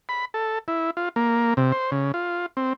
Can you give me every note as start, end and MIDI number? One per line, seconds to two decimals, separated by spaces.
0.09 0.25 83
0.34 0.59 69
0.68 0.91 64
0.97 1.09 65
1.16 1.54 58
1.57 1.72 48
1.72 1.91 72
1.92 2.12 49
2.14 2.46 65
2.57 2.73 60